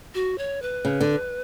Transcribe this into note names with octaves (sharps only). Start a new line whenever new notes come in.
F#4
C#5
B4
C#3
D3